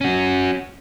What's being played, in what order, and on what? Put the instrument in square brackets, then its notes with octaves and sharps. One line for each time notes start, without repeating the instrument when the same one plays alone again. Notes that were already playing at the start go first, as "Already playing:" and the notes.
[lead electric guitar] C#4 F#4